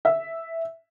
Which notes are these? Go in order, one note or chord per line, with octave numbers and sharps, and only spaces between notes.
E5